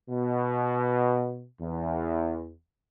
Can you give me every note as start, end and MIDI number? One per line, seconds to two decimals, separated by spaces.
0.10 1.46 47
1.61 2.52 40